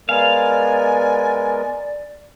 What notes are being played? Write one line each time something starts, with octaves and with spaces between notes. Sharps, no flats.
G#3 B3 A#4 D5 F5 G#5